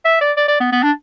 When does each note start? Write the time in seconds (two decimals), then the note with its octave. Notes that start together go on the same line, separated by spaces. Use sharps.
0.05 E5
0.21 D5
0.37 D5
0.48 D5
0.60 B3
0.72 B3
0.83 D4